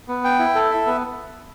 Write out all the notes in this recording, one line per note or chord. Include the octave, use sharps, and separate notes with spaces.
B3
G5
E4
A4
E5
B3